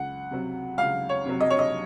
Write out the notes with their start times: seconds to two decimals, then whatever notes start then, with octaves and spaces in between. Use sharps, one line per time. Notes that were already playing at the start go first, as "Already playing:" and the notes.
Already playing: C#2 F#5
0.31 C3 F#3
0.78 C#2 F5
1.09 C#5
1.25 C3 F#3
1.40 D#5
1.50 C#5
1.59 D#5